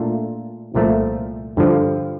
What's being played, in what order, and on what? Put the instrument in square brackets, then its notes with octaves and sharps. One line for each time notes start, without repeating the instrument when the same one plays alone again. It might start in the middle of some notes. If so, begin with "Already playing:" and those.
Already playing: [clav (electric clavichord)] A#2 A3 D4 F4
C2 A#2 F3 A3
G2 D3 F3